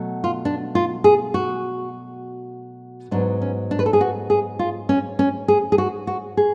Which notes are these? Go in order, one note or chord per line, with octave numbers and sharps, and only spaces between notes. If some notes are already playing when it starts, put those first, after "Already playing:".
Already playing: B2 F#3 A3
F4
D4
F4
G#4
F#4
G#2 F#3 B3 D4
C#4
D4
B4
A4
G#4
F#4
G#4
F4
C#4
C#4
G#4
G#4
F#4
F#4
G#4